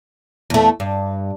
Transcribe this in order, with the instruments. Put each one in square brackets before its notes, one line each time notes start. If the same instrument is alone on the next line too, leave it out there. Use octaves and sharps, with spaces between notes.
[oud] E2 A3
G2